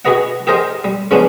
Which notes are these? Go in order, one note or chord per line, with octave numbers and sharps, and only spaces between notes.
F#4 G#4 B4 D#5 F#5
G4 G#4 A#4 C5 D#5 G5
G3
C#3 F3 G#3 B3 C#4 D4